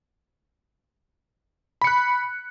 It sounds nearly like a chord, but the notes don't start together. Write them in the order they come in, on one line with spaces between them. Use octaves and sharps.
B5 C#7 F#6